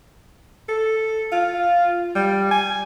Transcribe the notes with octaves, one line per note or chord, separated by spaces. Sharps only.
A4
F4
G3
G#5